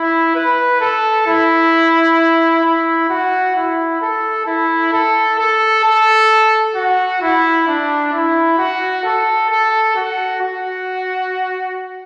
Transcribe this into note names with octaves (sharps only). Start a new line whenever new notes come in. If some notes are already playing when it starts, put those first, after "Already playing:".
Already playing: E4
B4
A4
E4
E4
F#4
E4
A4
E4
A4
A4
A4
F#4
E4
D4
E4
F#4
A4
A4
F#4
F#4